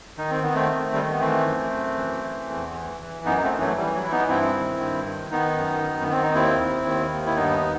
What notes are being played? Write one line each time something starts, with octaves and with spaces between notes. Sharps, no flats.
D#3 D#4
C4
D#3 B3
A3 C4
D#3
D#3 G3
A3
B3
E3 A3 C4
F#2
F#2
E3
E3
E2
E3
E3
F#2 B3 D#4
D#4
A3 C4
E3
F#3 A3
E3 G3
F#3
E3 E4
B3 D#4
G2 C4 E4
D#3
G2
D#3
D#3 B3 D#4
F#2
D#3
B3
D#3 C4
D#4
D#2 C4 E4
D#2
D#3
D#2
E4
G2 B3 D#4